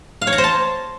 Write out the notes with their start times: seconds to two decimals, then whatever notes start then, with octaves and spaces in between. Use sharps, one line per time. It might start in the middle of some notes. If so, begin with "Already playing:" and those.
0.22 F5
0.27 C#5
0.33 A#5
0.38 C5
0.44 A5